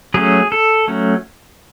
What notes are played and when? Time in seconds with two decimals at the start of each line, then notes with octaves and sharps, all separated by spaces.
0.14 F#3 A3 C#4 G#4
0.52 A4
0.88 F#3 A3 C#4